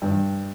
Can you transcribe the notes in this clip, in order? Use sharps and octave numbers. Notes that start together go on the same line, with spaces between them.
G2